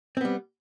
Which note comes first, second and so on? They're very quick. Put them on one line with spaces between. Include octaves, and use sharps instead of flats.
C4 B3 G3